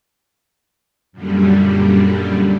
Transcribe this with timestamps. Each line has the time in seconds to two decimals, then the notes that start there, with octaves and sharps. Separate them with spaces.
1.12 F#2 A#2 D3 G3